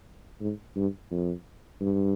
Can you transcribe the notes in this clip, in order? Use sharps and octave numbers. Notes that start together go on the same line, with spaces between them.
G#2
G2
F2
G2